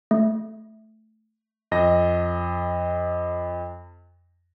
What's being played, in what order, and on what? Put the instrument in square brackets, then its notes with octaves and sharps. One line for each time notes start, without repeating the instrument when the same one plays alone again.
[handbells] A3
[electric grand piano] F2 D#5 A#6